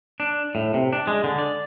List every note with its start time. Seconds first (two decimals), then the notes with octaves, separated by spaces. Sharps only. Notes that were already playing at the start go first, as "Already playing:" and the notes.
0.20 D4
0.55 A2
0.74 C3
0.93 D4
1.07 G#3
1.24 D3
1.39 D5